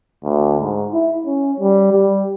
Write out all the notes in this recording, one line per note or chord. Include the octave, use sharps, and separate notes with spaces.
D2
G#2
E4
C#4
G3
G3